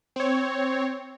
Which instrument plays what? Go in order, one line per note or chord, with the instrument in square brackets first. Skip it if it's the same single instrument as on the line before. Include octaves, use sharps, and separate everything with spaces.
[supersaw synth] C4 C#5